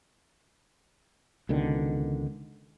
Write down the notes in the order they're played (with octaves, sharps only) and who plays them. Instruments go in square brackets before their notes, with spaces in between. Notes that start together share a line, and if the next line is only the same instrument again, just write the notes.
[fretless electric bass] C#2 B2 D3 D#3